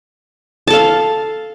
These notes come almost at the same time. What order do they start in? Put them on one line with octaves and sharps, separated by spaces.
A5 A4 F5